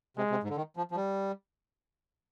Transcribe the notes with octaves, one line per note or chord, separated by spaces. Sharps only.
C3 G#3
C3
G#2
D3
D#3
F3
F3
G3